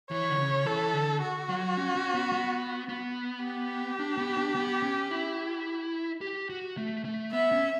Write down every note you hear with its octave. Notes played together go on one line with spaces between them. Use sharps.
E3 C#5
D3
C#3
E3 A4
D3
F#4
F#3
C#4
C#4
B3
B3
B3
G4
D4
B3
D4
B3
C#4
E4
G4
F#4
A3
A3
B3 E5
C#4